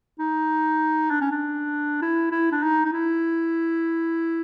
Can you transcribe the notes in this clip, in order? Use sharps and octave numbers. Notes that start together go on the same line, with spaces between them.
D#4
D4
C#4
D4
E4
E4
D4
D#4
D#4
E4